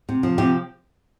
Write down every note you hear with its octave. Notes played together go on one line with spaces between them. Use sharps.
C3
F3
C3 G4